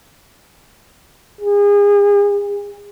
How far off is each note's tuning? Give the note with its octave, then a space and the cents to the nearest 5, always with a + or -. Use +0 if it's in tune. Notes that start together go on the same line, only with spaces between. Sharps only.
G#4 -35